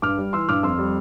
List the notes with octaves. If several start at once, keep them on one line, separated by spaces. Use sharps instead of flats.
G2 D6 F6
G3
E3 C6 E6
G2 D6 F6
F2 C6 E6
G3